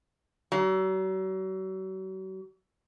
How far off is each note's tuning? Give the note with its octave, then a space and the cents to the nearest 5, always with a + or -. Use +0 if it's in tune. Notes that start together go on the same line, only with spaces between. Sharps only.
F#3 +40